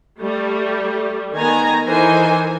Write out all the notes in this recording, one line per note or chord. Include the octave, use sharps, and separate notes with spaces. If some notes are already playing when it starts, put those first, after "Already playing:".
G3 A3
D#3 B3 G#5 A#5
E3 D#4 A4 A#4 C5 G#5